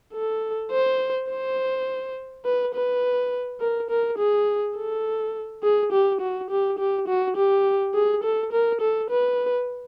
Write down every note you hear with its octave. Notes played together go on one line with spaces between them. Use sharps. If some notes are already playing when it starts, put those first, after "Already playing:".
A4
C5
C5
B4
B4
A#4
A#4
G#4
A4
G#4
G4
F#4
G4
G4
F#4
G4
G#4
A4
A#4
A4
B4